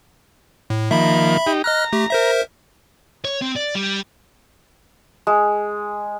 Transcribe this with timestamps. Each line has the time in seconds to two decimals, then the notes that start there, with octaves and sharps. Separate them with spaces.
0.70 A2
0.91 D#3 F3 A#3 E5 B5
1.47 D#4 G4
1.64 D#5 A#5 F6 F#6
1.93 A3 G4
2.10 A#4 C5 E5
3.25 C#5
3.42 C4
3.56 D5
3.75 G3
5.27 G#3